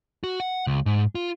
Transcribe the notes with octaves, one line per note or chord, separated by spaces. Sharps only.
F#4
F#5
C#2
G#2
F4